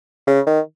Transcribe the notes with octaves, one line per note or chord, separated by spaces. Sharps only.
C#3
D#3